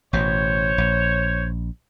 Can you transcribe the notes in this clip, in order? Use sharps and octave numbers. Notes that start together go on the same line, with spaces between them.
A1 B2 C5 C#5
A#1